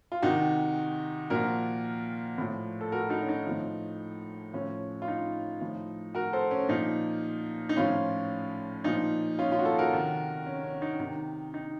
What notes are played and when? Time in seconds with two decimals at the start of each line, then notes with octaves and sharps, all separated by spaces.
0.12 F4
0.22 C3 D#3 D#4 F#4
1.30 A#2 F3 F#4 A#4
2.38 A2 F3
2.81 A4
2.92 F#4 A#4
3.09 D#4 F#4
3.22 C#4
3.29 D#4
3.46 A2 F3
4.54 A2 F3 C#4
5.02 F4
5.08 D#4
5.61 A2 F3
6.15 F#4 A#4
6.33 A4 C5
6.51 C#4
6.69 A#2 F3 D#4
7.69 D#4
7.76 A2 F3 C#4 F4
8.84 A#2 F3 D#4
9.39 C#4 F4
9.52 C#4 F4
9.59 F#4
9.65 F4 A4
9.79 F#4 A#4
9.93 C3 D#3
10.46 C#4
10.64 C#4
10.82 D#4
11.00 C3 D#3 D#4
11.54 D#4